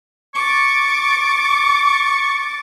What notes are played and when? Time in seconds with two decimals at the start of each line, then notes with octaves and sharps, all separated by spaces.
0.35 C#6 D6 A6